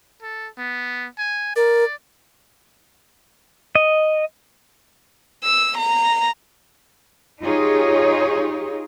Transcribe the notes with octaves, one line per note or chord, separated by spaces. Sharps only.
A4
B3
G#5
A#4 D5
D#5
E6
A#5
D#4 F4 G4 G#4 C#5